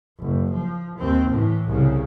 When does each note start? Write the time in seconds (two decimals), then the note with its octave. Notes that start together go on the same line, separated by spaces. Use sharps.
0.19 F#1
0.52 F3
0.97 D#2 C4
1.29 A2 E3
1.68 C2 C#3